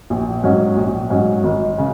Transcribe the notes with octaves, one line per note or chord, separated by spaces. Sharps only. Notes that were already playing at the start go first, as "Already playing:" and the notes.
A#1
G#2 F#3 C#4
A#1
G#2 F#3 C#4
G#1
C#3